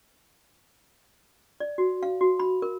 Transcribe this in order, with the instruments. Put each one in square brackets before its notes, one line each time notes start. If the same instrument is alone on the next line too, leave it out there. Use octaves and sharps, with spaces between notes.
[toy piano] D5
F#4
F5
F#4
B5
A#4